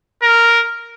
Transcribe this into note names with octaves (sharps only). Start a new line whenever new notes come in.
A#4